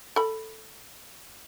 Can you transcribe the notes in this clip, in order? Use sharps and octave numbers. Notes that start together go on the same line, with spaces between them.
A4 B5